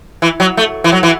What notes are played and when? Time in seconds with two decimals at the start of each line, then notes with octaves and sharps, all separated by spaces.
0.22 E3
0.40 F#3
0.57 A3
0.84 E3
0.92 F#3
1.03 E3